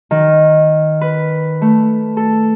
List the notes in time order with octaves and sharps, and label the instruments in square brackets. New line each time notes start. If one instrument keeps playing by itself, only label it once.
[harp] D#3
B4
A3
A4